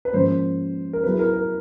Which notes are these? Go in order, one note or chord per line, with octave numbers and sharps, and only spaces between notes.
B4
G#2 F3 A#3 C#4 C5
A#4
F#3 B3 E4 G#4 B4
A#4
A#4